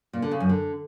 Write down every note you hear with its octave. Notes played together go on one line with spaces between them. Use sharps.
A#2
D3
C#3
F#2
D3